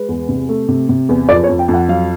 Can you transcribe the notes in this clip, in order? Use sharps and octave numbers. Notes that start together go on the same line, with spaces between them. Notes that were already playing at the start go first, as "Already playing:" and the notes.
Already playing: G#3 B4
E2
C3
A3
C3
C3
E2
F2 D5
C#5
F2
G5
F2
F#5
F#3 F5